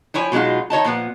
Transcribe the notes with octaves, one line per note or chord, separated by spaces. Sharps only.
F3 E4 C#5 G#5
B2 F#3 G#3 D#4 F4
D#3 C#5 D#5 A5
A#2 F3 B3